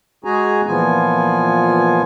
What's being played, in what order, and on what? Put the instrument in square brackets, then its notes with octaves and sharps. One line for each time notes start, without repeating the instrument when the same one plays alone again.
[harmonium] G#3 F#4 G#4 G#5 A#5
A#2 E3 F3 B3 F4 G#5